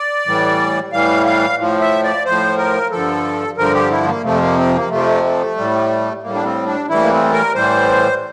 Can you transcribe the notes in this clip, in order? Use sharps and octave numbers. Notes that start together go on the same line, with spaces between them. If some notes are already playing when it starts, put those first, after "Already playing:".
Already playing: D5
A2 E3 G3
A2 E3 G3 F5
F5
A2 F3
E5
D5
A2 F3 C5
A#4
G2 D3 F3 A4
G2 D3 F3 A#4
G4
E4
A#3
F2 C3 F3 A3
A#3
C4
A#3
F2 C3 F3 A3
A3
A2 G3
A2 G3 A#3
D4
C4
D4
A2 E3 G3 E4
A#3
C4
A#4
A2 E3 G3 C5